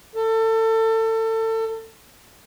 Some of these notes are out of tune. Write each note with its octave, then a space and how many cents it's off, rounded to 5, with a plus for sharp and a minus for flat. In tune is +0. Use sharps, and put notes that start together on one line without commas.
A4 +30